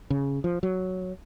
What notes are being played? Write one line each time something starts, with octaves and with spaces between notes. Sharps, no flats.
C#3
F3
F#3